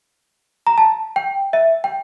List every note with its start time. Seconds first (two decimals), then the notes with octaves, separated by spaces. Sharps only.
0.67 A#5
0.78 A5
1.16 G5
1.53 E5
1.84 G5